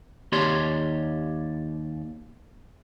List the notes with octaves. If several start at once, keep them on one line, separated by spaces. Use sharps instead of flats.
D#2 G4 C#5 D5 C6